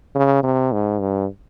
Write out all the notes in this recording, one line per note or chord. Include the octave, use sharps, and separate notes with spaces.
C#3
C3
G#2
G2